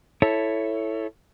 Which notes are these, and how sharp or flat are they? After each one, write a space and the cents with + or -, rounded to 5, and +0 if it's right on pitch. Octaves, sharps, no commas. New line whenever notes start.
E4 +0 A4 +0 C#5 +0